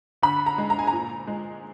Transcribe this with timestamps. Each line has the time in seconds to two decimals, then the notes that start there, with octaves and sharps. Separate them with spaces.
0.22 D3 B5
0.46 A#5
0.58 G#3
0.70 A#5
0.79 G#5
0.87 A#5
0.92 A#2
1.27 G#3